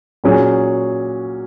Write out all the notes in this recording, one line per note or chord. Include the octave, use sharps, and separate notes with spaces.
A#2 F#3 C#4 G#4